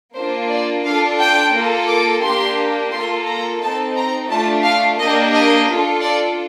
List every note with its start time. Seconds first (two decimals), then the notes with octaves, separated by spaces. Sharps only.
0.15 A#3 D4 F4 C5
0.50 D5
0.84 D4 F4 A4 F5
1.19 G5
1.53 A#3 F4 A4
1.88 D6
2.22 A#3 D4 G4 C6
2.92 A#3 F4 A4 C6
3.26 A#5
3.61 C4 D#4 A4 A5
3.96 A#5
4.29 A3 D4 F4 A5
4.64 F5
4.99 A#3 D4 G4 D#5
5.33 D#5
5.68 D4 F4 A4
6.03 D5